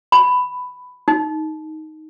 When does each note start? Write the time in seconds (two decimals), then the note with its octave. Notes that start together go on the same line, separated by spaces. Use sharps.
0.12 B5
1.08 D#4